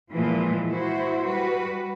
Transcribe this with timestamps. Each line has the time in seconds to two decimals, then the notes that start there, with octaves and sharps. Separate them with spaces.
0.15 A#2 E3 F3 G#3
0.70 E4 F#4 C5
1.26 G3 F#4 B4